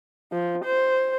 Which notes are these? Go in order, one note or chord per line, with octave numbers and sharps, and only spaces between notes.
F3
C5